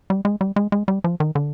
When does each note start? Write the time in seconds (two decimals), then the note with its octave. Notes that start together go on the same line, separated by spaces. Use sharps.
0.10 G3
0.25 G#3
0.41 G3
0.56 G#3
0.72 G#3
0.88 G3
1.04 F3
1.20 D#3
1.35 D3